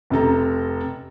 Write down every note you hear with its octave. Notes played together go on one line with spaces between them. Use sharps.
F1 C3 A4 A#5